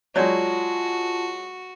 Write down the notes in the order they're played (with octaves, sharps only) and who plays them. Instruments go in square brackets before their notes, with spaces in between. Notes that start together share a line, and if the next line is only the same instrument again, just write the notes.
[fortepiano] F#3 G#3 [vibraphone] F4 A5 [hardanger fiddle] F#4 [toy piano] C#5 D5